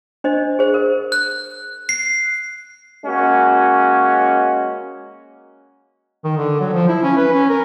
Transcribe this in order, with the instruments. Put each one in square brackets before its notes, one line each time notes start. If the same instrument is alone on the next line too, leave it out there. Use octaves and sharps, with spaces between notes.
[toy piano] D4 C5 D#5
G#4 C5
A#4
[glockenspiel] F#6
C7
[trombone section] G#3 A#3 C#4 F#4
[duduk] D#3
D3
F#3
F3
E4
C#4
B4
C#4
A#4